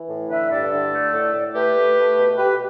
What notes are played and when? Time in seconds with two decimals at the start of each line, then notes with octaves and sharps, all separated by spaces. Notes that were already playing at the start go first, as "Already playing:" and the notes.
Already playing: E3
0.10 A2
0.30 D3 B4 E5
0.51 G2 A4 D5
0.72 D3
0.93 A3
1.14 A2
1.34 A2
1.55 A3 G4 B4
1.76 A3
1.96 A3
2.17 B2
2.37 B2 G4 B4